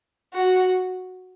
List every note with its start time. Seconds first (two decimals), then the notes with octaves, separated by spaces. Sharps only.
0.33 F#4